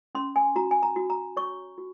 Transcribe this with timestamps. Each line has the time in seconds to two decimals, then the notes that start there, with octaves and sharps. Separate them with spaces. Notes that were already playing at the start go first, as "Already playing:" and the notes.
0.15 C#4 C6
0.36 G#5
0.56 F#4 A#5
0.71 G#5
0.83 A#5
0.96 F#4
1.10 A#5
1.37 C#5 C#6
1.78 F#4